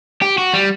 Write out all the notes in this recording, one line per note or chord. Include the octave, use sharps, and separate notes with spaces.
G4
F#4
G3